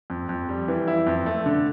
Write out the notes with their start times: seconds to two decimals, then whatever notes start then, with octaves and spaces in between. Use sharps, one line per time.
0.10 F2
0.29 F2
0.49 G3
0.68 E3
0.88 E4
1.07 F2
1.26 A3
1.46 D3